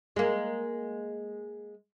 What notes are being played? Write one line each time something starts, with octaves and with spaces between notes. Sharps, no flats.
G#3 A#3